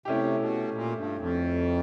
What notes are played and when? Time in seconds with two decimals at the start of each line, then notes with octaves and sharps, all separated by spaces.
0.05 C3 A3 C#4 E4 G4
0.39 B2
0.73 A#2
0.96 G2
1.19 F2